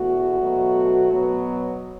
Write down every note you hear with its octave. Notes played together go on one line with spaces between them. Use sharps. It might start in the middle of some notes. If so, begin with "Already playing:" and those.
Already playing: E2 B2 A3 F#4
B2 F#3 A3
B2 F#3 B3